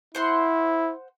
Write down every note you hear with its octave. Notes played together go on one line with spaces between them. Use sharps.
E4 C5 F#5 C6